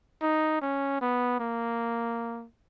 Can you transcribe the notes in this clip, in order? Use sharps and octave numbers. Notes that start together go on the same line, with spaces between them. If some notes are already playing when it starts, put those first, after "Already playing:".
D#4
C#4
B3
A#3